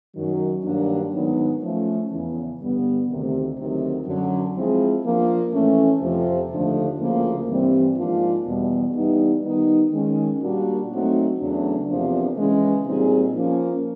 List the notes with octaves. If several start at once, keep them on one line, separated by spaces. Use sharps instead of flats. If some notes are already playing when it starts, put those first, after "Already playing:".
F#2 D#3 F#3
G2 D#3 F#3 A#3 D4
G#2 D#3 F#3 B3 D#4
F3 A3 C#4
E2 C#3 E3
G2 D3 G3 B3
D2 C3 D#3
D2 C3 D#3 F#3
F#2 D3 F#3
F3 G#3 C4 E4 G#4
F3 A#3 D4
A2 E3 A3 C#4
F2 C3 F3
D#2 D3 F3 A3 D4
D2 C#3 F3 A#3
G2 E3 G3 C4
G#2 F3 A#3 D4 F4
E2 B2 G3
E3 G3 B3 D#4
D#3 G3 B3 D#4
D#3 G#3 C#4
A#2 G3 A#3 D4 F#4
F#3 A3 C4 D#4 F#4
E2 C#3 F#3 A3 D4
E2 C3 F3 A#3 D4
C#3 E3 G#3 C#4
A#2 G3 C4 D#4 G#4
F3 A#3 C#4